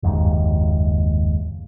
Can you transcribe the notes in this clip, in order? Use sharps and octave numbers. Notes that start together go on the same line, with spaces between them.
F#1 D#2 G#2